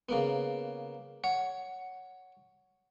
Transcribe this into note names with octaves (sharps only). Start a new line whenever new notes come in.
C#3 A#3 B3
C#5 F#5